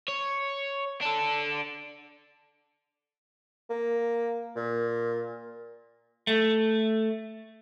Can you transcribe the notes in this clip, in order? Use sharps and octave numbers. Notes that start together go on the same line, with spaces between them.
C#5
D4 A4
A#3
A#2
A3